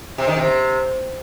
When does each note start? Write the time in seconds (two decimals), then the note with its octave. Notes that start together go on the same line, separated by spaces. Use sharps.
0.18 C3
0.27 D#3
0.36 C3